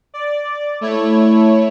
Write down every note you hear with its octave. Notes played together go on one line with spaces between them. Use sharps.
D5
A3 E4 C#5